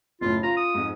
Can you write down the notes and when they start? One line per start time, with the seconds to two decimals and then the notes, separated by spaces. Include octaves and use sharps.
0.21 F#1 A2 F4
0.43 F4 A#5
0.57 D#6
0.74 F2 G#2